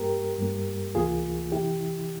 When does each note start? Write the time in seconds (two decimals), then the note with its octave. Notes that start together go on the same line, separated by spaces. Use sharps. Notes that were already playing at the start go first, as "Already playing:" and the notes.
Already playing: G2 G3 A#3 G4 A#4
0.39 G2 G3 A#3
0.95 C#2 C3 E3 A#3 F4 G#4
1.52 F2 C3 E3 E4 G4